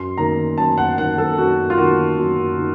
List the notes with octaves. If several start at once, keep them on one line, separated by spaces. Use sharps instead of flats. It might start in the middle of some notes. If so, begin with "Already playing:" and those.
Already playing: F#2 C6
D#3 A#3 A#5
F#2 A5
F#5
D#3 A#3 F#5
A4
F#2 F#4
F4
D#3 A#3 F#4
F#2
D#3